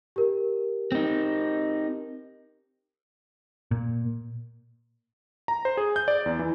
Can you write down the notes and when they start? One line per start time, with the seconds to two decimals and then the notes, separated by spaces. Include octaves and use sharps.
0.16 G4 A#4
0.92 C4 D#4
3.71 A#2
5.48 A#5
5.65 C5
5.77 G#4
5.96 G6
6.08 D5
6.26 E2
6.39 E3